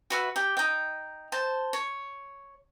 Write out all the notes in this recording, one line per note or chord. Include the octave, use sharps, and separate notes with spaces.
F#4 B4 E5
G4
D#4 G5
C5 A5
C#5